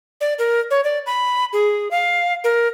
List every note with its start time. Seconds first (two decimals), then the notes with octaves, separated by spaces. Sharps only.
0.21 D5
0.39 A#4
0.71 C#5
0.84 D5
1.06 B5
1.53 G#4
1.91 F5
2.44 A#4